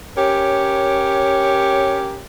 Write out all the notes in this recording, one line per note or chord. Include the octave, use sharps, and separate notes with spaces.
C#4 G4 A#4 C#5